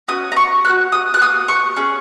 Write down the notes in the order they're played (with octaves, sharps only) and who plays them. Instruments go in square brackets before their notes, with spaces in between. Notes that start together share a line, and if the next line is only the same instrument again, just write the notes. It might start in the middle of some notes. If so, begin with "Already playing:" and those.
[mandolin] C#4 F#4 D#6
A#5
C#6
A#3 F#6
F#4
D#6
F#6
A#3 F#4 D#6
C#6
C#4 G#4